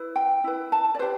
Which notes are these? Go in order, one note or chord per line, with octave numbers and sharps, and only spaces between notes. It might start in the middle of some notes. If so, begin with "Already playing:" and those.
Already playing: E4 B4
G5
E4 B4
A5
D5
G4 B4 C5